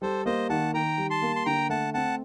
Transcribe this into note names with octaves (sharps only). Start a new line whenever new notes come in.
G3 A4 C5
A#3 C5 D#5
D#3 F#5 A5
D#3 G5 A#5
G3
A5 C6
A#3
C6
D3 G5 A#5
A3 F#5 A5
C4 F#5 A5